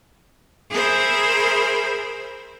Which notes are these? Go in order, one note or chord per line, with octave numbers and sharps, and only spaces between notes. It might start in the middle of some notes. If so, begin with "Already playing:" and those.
G#4 A#4 C5 E5 B5